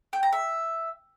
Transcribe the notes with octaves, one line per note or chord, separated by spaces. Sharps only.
G5
A#5
E5